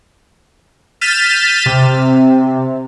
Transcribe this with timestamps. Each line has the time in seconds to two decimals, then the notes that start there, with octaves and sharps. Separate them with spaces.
1.01 F6 G6 A6 B6 D#7 E7
1.66 C3